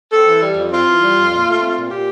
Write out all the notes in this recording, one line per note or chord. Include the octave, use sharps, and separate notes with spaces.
C4 A4
E3
G3
F2
C4 F4
E3
G3
F2
A#2
A3
C4
A#2
A#2 G4